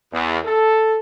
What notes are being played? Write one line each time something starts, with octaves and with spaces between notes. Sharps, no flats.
E2
A4